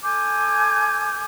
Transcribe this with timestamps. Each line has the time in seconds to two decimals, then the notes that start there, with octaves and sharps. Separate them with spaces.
0.02 A4 G#5 D6 G6